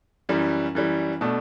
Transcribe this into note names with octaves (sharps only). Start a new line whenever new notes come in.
F#2 E3 G3
F#2 E3 G3
B2 A3 D4